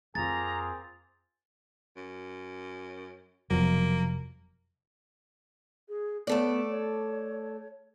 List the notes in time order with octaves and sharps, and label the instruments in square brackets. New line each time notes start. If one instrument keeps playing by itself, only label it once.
[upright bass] F2 F4 [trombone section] A#3 C4 G#4 [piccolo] A#5 [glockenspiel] A6
[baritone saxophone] F#2
[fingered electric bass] F1 [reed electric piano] B2 F3 F#3 [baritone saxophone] A#3
[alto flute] G#4
[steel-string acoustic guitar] A3 A4 D5 [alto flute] B3
[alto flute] C#5